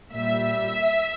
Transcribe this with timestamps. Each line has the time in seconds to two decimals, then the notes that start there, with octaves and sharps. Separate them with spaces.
0.13 A#2 G3 E5